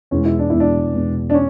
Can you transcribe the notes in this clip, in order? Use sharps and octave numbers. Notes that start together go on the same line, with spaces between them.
E2 B2 G#3 C#4
E4
D4
E2 B2 G#3 E4
D4
E2 B2 G#3
D4
C#4